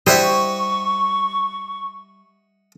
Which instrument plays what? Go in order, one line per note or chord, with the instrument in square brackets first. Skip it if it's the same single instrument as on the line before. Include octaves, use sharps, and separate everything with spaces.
[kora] G3 E4 C5 [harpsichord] D#5 E5 F#5 [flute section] C#6